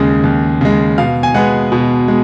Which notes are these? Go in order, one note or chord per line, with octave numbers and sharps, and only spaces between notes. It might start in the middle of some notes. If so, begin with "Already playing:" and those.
Already playing: D#2 C#3 G#3
D#2
C#3 G#3
B2 F5
G#5
G#3 B3 F#5
B2
G#3